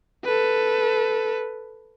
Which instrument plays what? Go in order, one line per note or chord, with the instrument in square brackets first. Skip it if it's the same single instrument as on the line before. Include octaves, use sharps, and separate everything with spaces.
[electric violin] A4 B4